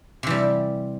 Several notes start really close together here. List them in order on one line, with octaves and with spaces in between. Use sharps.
C3 E3 G3